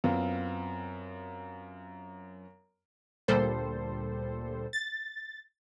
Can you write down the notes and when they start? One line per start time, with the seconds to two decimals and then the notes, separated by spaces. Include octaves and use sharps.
0.04 F#2 B3 C4 F4
3.28 D2 A#2 G3 A4 C5
4.73 A6